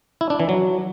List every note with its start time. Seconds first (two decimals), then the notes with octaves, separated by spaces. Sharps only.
0.21 E4
0.30 D4
0.40 E3
0.49 F#3